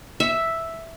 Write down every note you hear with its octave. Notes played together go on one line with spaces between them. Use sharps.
E5